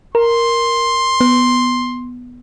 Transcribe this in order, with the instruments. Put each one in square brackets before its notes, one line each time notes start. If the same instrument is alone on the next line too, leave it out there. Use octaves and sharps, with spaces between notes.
[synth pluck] A#4 [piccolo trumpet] C6
[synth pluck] B3